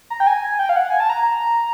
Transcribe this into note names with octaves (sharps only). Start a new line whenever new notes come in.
A#5
G5
G#5
G#5
G5
F5
F#5
G#5
A5
A#5